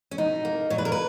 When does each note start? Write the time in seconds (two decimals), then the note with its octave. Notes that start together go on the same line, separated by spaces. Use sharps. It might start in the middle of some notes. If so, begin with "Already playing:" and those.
0.11 C#4
0.18 B2 D#4
0.45 A#3
0.70 A#2 C#5
0.78 B4
0.85 A#4
0.92 B4